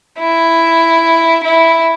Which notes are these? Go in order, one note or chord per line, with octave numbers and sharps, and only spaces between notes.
E4
E4